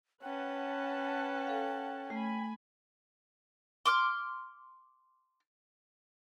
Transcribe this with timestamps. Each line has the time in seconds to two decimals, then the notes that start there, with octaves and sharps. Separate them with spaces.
0.23 C#4 B4 F#5 G5 A5
1.47 A4 F5
2.10 A3 G#5 B5
3.86 C6 D6 F6